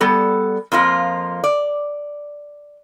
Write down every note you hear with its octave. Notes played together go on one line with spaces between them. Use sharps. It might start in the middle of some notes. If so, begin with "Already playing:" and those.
G3 B3 A4
F2 F3 A#3 F4
D5